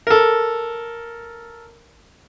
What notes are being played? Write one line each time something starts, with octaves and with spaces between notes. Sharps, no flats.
A4 A#4